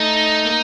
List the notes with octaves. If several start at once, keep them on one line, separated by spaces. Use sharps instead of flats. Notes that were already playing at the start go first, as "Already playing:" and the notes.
Already playing: A3 D#4
A#3